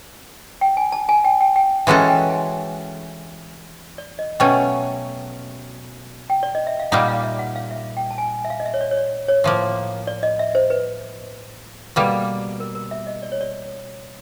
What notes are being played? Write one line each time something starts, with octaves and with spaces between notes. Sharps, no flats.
G5
G#5
A5
G#5
G5
G5
G5
E3 G#3 C#4 F#4 A4
G5
G#5
D5
D#5
B2 F#3 A3 C#4 G5
G5
D5
D#5
E5
F5
A#2 G3 A#3 D#4 F#5
F5
E5
F#5
F5
E5
F5
G5
A5
G#5
E5
F5
D#5
E5
C#5
D5
C#5
D5
C#5
A2 F3 A#3
D5
D#5
E5
C5
B4
B2 G3 A#3 A4
A#4
A#4
E5
D#5
D5
C#5
D5